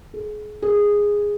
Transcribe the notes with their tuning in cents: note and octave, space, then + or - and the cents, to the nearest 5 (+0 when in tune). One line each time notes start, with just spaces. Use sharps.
G#4 +30
G#4 -10